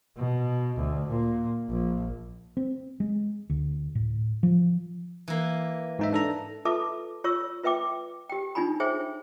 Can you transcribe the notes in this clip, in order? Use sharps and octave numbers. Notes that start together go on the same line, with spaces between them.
B2
D2
A#2
A#1
C4
G#3
D2
A2
F3
E3 A#3
G#2 D#4 E5
D4 A4 A#5
F4 A4 B4 E5 A5 D6
F4 C#5 C#6 E6
F4 B4 E5 G5 D6
G4 G5
D4 D#4 F4 G#5 B5
G#4 C5 C#5 E5 G5